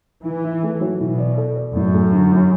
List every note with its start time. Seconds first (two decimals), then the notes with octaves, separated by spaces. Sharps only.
0.24 E3 E4
0.44 E4
0.63 A3
0.81 F#3
1.00 B2 E3
1.18 D5
1.38 A4
1.56 D5
1.75 F#2 A2
1.94 A3
2.13 D3
2.32 F#3